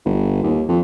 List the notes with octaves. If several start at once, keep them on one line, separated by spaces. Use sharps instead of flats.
G1
D#2
F2